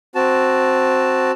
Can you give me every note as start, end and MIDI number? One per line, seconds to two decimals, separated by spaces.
0.15 1.31 60
0.15 1.31 66
0.15 1.31 81